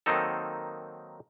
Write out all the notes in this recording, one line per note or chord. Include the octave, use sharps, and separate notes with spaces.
D#3 F#3 A#3 C4 D#4 A4